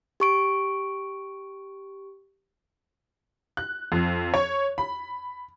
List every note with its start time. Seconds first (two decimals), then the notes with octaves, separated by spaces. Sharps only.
0.20 G4 C#6 D7
3.57 F#6
3.92 F2
4.34 C#5
4.78 B5